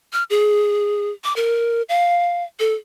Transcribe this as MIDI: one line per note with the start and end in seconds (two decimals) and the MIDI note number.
0.13 0.23 89
0.30 1.11 68
1.24 1.35 86
1.36 1.82 70
1.89 2.43 77
2.59 2.74 69